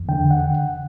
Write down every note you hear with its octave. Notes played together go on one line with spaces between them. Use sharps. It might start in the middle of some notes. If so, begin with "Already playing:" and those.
Already playing: E2
D3 G5
F#5